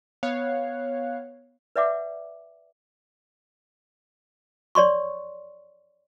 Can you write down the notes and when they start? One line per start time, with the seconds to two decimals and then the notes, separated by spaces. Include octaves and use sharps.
0.23 B3 C#5 F5 F#6
1.76 B4 D5 E5 F#5 D6
4.75 C#5 D5 C6 C#6